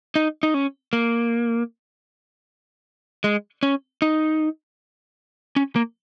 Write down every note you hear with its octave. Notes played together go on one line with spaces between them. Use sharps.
D#4
D#4
C#4
A#3
G#3
C#4
D#4
C#4
A#3